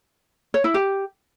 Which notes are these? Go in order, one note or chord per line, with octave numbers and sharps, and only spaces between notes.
C#5
E4
G4